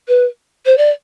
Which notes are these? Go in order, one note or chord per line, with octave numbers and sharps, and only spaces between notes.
B4
C5
D5